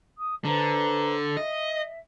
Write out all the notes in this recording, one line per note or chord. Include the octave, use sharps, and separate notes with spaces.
D#6
D3 B4 C5 A#5
D#5 E5